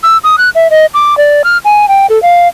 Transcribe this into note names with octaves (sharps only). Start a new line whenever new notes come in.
E6
D#6
F#6
E5
D#5
D6
D5
F6
G#5
G5
A4
F5